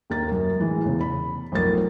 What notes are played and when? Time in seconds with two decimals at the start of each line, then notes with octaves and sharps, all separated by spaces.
0.10 D#2 A#3 A6
0.28 F#2 A#4
0.59 A2 E3 G#3
0.84 E2 C#3
1.01 B5
1.52 B1 F2 A3 A#4 A6